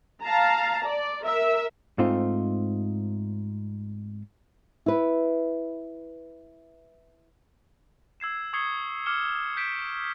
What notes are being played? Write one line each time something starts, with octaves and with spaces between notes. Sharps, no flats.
F5 A5 A#5
D5
A#4 E5
G#2 A3 C4 D#4 F4
E4 B4
E6 G#6 C7 E7
C#6 D#6 G#6 C7 C#7 G7
D6 F6 C#7 E7 G7
G6 B6 D7 E7